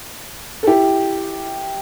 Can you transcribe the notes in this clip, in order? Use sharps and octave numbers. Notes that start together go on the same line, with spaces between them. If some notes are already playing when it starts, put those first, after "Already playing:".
A4
E4 G4